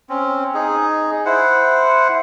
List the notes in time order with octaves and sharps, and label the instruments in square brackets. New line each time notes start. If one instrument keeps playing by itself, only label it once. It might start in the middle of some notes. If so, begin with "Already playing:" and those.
[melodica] C4 C#4
D#4 G#4
E4 C5 F#5